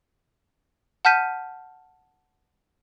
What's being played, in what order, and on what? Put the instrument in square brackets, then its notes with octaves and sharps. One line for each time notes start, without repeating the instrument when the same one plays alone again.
[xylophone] F#5 A5 F6 G6 B6 D#7